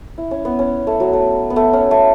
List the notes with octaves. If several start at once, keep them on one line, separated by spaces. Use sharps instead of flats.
E4
C#4
B3
C#4
A3
F#3
A3
B3
A3
C#4
A3